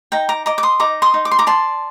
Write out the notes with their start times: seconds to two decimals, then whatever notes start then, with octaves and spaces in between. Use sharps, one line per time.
0.12 D#4 G5 A#5
0.29 A#5 D6
0.46 D#5 A#5 D6
0.58 D6
0.63 C6 D#6
0.80 D#4 A#5 D6
1.02 C6 D#6
1.14 D#4
1.25 D6
1.31 C6
1.39 A#5 D6
1.47 D5 A5 C6